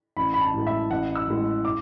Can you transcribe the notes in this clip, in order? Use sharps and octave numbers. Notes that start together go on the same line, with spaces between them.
A1 B5
B5
A5
A2 G#3
E5
A1 F#5
E6
A2 G#3
D6